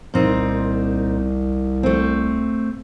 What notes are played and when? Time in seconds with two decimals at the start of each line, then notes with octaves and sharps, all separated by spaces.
0.14 C2 A#2 C4 D#4
1.83 A3 C4